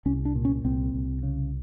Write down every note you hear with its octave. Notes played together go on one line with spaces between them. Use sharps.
C2 C#4
D4
A#2
C#4
C2 C4
C2
C#3